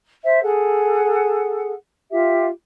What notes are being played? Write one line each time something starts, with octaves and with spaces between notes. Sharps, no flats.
C5 E5
G#4 A4 F#5
F4 G4 E5